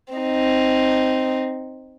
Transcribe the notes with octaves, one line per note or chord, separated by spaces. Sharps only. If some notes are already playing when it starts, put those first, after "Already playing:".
C4 D#4